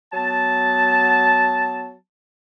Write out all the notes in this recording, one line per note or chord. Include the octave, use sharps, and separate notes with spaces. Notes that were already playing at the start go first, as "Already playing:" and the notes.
F#3 B3 A5